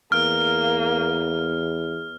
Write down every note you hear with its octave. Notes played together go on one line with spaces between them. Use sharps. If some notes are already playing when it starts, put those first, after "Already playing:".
E2 A#3 F6